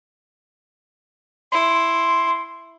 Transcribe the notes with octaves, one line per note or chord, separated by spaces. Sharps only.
E4 C6